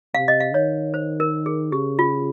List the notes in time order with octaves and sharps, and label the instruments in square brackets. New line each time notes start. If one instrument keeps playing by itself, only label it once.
[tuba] C3 [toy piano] F5
[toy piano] D#5
F5
[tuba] D#3 [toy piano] C#5
[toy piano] C5
A#4
G#4
[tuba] C#3 [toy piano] G4
[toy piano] F4